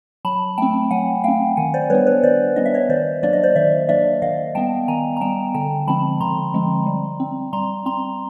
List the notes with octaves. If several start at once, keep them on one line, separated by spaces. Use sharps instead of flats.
F#3 A5 B5
A3 C4 G5 A5
F#3 F#5 G#5
A3 C4 F5 G5
D#3 F#5 G#5
C5 D5
G3 B3 D4 B4 C#5
B4 C#5
D#3 C5 D5
G3 B3 D4 D#5
E5
C#5 D#5
D#3 C5 D5
F#3 A#3 D4 D5
D#5
C5 D5
D#3 D5 E5
F#3 A#3 D4 D5 E5
D#3 D#5 F5
G3 B3 G5 A5
D#3 G#5 A#5
A#5
G3 B3 G5 A5
D3 G5 A5
F3 G#3 C4 A5 B5
D3 A#5 C6
F3 G#3 C4
G3
C4
G3 A#5 C6
C4 A#5 C6